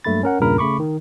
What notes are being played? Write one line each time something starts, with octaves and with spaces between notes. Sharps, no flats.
G2 F#3 A3 A#3 B5 A6
C#4 A#4 F#5
E2 G2 A#2 C#3 A#4 B5
C#3 A3 B5 C#6 D6
D#3